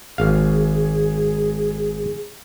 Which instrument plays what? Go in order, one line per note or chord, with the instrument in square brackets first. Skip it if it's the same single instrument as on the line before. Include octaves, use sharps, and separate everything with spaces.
[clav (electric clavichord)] G#1 F5 [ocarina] G#4